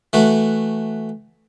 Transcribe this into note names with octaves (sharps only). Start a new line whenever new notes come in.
E3 A3 F#4